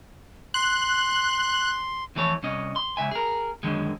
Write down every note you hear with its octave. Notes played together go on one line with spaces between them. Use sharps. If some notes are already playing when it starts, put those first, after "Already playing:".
C6 F#6
F2 E3 A3 A4 C#5
C2 C#4 D#5
C6
C#2 E5 G#5
G#4 A#4
F#2 D3 D#3 G#3